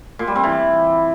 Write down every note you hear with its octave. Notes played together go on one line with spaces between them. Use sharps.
A#2
G3
C4
E3